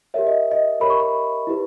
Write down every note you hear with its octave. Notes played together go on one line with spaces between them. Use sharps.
G4 A#4 C#5 E5
D#5
D#5
G4 A#4 C#5 B5
C#6
B5
E4 G4 B4